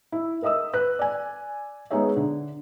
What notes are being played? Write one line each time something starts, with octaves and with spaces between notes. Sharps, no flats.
E4
A#4 D#5 E5 D#6 E6
B4 F#6
D5 G#5
G#3 B3 D#4 G#4 C#5 E5
D3